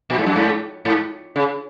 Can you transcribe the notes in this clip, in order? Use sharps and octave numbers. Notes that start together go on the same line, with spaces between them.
A#2
G#2
F#2
G#2
G#2
C#3